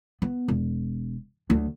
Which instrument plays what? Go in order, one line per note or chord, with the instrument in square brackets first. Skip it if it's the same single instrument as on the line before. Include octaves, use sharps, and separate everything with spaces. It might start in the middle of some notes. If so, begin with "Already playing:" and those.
[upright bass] B3
E1
D2 F#3